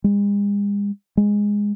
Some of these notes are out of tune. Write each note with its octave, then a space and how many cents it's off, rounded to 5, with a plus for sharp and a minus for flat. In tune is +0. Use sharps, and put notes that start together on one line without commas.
G#3 -45
G#3 -10